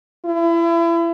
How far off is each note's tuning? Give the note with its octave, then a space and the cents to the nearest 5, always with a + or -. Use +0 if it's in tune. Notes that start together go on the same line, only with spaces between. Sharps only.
E4 +30